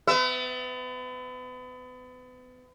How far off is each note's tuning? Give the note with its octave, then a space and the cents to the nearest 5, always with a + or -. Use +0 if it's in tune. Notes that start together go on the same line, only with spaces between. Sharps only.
B3 +35 E5 +0